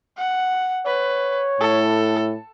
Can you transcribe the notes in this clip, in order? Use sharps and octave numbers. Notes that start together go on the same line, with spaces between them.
F#5
B4 C#5
A2 A4